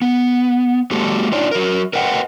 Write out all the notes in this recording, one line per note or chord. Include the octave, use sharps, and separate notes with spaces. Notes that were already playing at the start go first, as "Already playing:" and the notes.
B3
F#3 G#3 A#3 G4 A4
D4 D#4 F4 C#5 D5
F#3 A#4
A#4 B4 D#5 F#5 G5